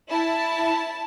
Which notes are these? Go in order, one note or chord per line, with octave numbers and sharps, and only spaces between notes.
E4 A5